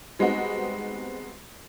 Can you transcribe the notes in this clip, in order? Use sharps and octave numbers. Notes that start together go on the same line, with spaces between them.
G3 G#3 B3 C4 D#4 F#4